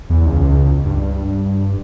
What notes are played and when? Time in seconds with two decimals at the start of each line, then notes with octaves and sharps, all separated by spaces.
0.10 E2
0.26 C#2
0.85 G2